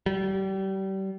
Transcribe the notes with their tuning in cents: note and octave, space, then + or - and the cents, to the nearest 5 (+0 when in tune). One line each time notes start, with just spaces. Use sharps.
G3 -30